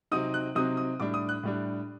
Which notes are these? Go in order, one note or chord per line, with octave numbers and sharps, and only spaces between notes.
C3 F#3 C4 D#4 D#6
F#6
C3 F#3 C4 D#4 D#6
D#6
A2 G3 D4 D6
D#6
F#6
A2 G3 D4